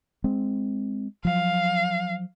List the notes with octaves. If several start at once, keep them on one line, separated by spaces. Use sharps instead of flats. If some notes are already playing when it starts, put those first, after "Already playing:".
G#3 C4
F3 F#3 F5